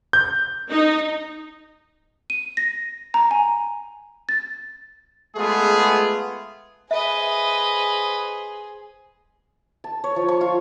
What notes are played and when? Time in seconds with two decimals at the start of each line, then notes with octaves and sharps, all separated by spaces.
0.13 G6
0.70 D#4
2.30 D#7
2.57 A#6
3.14 A#5
3.31 G#5
4.29 A6
5.36 G#3 A3 B3 F4 G#4
6.91 G#4 B4 C5 D#5 E5
9.84 A5
10.04 C#5
10.16 F3
10.28 C#6
10.41 F4